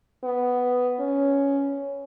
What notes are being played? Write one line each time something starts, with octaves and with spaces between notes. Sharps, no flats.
B3
C#4